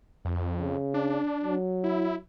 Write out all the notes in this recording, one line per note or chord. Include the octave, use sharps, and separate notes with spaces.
F2
C#3
D4
F#3
E4